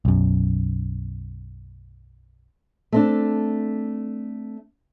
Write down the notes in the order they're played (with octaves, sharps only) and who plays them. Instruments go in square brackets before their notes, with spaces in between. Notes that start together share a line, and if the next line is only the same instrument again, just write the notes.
[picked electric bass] B1 F#2
[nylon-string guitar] A3 C4 D4